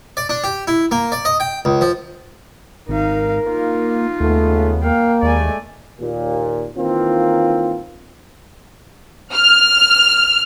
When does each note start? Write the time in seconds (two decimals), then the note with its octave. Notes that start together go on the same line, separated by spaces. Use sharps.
0.17 D5
0.29 D4
0.44 G4
0.67 E4
0.91 A#3
1.12 D5
1.25 D#5
1.40 G5
1.65 C#2
1.81 F3
2.89 G#1 D#4 A#4 F5
3.47 A#3 D#4 F4
4.20 D#2 C#3 G#3 A3 B3
4.83 A#3 F5 G5
5.23 D#2 G#3 A3 D5 G#5
5.99 D#2 A#2
6.76 D#3 E3 A#3 C4 F4
9.34 F6